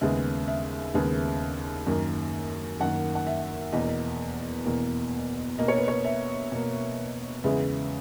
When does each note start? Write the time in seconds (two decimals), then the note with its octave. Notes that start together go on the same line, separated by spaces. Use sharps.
0.01 D#2 C#3 G#3 B3 E5
0.48 E5
0.94 D#2 C#3 G#3 B3
1.87 F#2 D#3 A#3
2.80 F#2 D#3 A#3 F#5
3.15 F#5
3.27 E5
3.73 E2 B2 A#3 D#5
4.66 E2 B2 A#3
5.58 B2 A#3 D#5
5.68 C#5
5.78 B4
5.88 C#5
6.05 E5
6.52 B2 A#3
7.44 E2 C#3 G#3 B3 E5